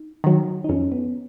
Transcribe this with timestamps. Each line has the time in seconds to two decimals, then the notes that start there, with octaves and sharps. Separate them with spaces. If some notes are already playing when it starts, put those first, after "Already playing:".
Already playing: D#4
0.24 D#3 F#3
0.64 D#4
0.69 F2 C#4
0.92 B3